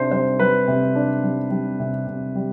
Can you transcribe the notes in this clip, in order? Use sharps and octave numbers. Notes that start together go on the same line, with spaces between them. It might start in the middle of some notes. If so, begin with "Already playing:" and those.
Already playing: C3 D4 C5
G3 C5
G3 B4
C3
D4
G3
G3
C3
C3
G3